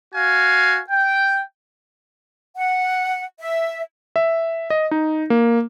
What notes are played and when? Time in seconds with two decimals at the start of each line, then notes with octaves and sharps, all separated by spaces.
0.14 F#4 F5 G#5
0.91 G5
2.56 F#5
3.39 E5
4.16 E5
4.70 D#5
4.91 D#4
5.30 A#3